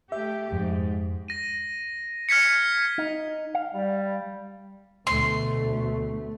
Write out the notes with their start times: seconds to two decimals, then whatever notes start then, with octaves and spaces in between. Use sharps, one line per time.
0.12 A3 G4 E5
0.52 F2 G#2
1.28 A#6 D#7
2.29 F6 G#6 B6 C#7
2.98 D#4
3.55 F5
3.74 G3
5.07 D2 B2 A3 C6